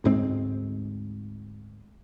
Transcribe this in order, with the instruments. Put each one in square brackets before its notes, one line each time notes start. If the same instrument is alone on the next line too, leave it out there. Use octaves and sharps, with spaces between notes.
[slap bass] D2 G#2 G#3 C4